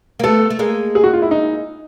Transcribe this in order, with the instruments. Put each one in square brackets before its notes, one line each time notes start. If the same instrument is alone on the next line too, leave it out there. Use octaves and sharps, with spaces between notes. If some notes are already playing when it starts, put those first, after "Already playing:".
[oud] A#3
[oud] A3 B3 [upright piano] A4
[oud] A3
G#3 A#3
[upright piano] G#4
F#4
F4
E4
D#4